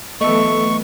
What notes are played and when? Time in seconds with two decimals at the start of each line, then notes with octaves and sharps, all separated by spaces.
0.21 E3 F#3 A3 B3 A4 D#5 C#6